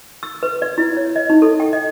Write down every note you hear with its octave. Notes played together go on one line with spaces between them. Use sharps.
E6
B4
D5
E4
C#5
D#5
D#4
A4
G5
D#5